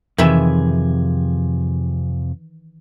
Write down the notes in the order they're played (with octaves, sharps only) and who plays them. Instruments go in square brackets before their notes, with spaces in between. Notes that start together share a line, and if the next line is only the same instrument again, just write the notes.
[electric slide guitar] F2 C3 G#4 [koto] D#3 E3 E5